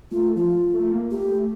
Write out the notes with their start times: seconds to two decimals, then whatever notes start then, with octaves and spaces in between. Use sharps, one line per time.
0.11 A3 F4
0.36 F3 F4
0.74 A3
0.92 A#3
1.11 A3 G4
1.30 A3